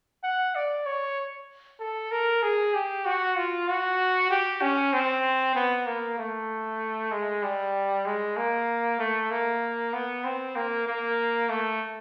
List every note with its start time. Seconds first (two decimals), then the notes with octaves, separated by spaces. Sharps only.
0.24 F#5
0.55 D5
0.86 C#5
1.80 A4
2.11 A#4
2.42 G#4
2.74 G4
3.05 F#4
3.36 F4
3.68 F#4
4.30 G4
4.62 C#4
4.93 C4
5.55 B3
5.86 A#3
6.18 A3
7.11 G#3
7.43 G3
8.06 G#3
8.37 A#3
8.99 A3
9.30 A#3
9.93 B3
10.24 C4
10.56 A#3
10.87 A#3
11.49 A3